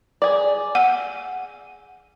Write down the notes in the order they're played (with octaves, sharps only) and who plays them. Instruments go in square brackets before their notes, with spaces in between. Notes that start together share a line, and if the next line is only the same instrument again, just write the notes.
[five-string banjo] G#4 D5
[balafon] F#5